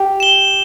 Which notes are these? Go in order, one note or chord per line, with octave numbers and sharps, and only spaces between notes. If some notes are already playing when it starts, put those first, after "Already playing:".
Already playing: G4
E7 G7